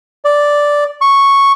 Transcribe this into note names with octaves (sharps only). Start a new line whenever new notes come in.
D5
C#6